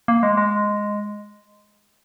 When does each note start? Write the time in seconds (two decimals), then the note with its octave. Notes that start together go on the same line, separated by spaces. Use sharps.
0.08 A#3
0.23 G#3
0.37 G#3